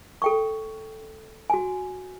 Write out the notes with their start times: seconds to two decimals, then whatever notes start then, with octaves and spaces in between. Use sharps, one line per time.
0.22 A4 G5 C#6
1.50 F#4 G#5